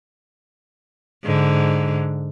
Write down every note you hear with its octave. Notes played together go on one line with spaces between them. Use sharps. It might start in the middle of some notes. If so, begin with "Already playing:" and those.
G#2 D3